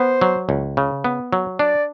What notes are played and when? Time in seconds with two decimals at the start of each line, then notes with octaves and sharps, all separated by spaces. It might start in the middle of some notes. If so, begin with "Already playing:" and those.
Already playing: B3 C5
0.21 F#3
0.49 C#2
0.77 C#3
1.04 B3
1.33 F#3
1.59 D4 D5